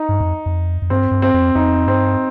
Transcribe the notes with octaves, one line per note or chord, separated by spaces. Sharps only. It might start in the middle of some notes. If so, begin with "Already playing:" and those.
Already playing: D#4
G2
F2
F2
F2
G2 C4
G2
C4
F2
F2 D#4
G2 C4